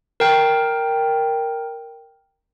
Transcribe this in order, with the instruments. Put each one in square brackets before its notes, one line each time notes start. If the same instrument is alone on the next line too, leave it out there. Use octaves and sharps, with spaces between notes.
[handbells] A#4 G5